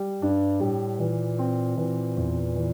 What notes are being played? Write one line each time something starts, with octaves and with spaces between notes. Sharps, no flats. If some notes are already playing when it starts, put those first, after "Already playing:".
Already playing: G3
G2 D4
A2 G3
A#2 E3
C4
A#2 E3
E2
E3